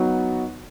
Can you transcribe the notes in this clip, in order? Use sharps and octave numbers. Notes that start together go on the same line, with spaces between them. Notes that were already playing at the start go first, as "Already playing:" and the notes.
Already playing: F#3 B3 D#4 F#4